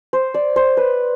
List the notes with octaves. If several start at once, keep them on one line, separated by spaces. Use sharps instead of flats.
C5
D5
C5
B4